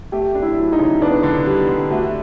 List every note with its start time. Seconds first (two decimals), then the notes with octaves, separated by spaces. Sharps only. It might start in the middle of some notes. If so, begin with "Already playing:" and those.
0.12 A3 G4
0.35 D4
0.42 E4
0.58 F#3
0.72 D#4
0.79 C#3
1.01 B3 D4
1.23 D3
1.46 G3
1.68 D3
1.91 A3 F#4